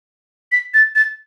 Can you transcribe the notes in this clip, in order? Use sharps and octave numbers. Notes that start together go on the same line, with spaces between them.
B6
A6
A6